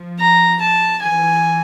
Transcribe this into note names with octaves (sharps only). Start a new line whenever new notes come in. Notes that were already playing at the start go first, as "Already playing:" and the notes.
Already playing: F3
A#5
A5
E3 G#5